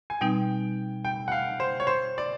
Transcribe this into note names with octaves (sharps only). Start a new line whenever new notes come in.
G#5
B2 G3 C4 D#4 G5
G5
F#5
F5
C5
C#5
C5
D5